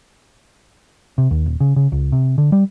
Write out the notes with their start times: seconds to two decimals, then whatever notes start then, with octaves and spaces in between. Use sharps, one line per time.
1.18 C3
1.31 D#2
1.46 D#1
1.60 C#3
1.76 C#3
1.92 C#2
2.12 C3
2.38 D3
2.52 G3